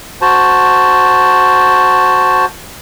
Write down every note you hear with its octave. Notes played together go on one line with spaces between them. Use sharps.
F#4 C5 A5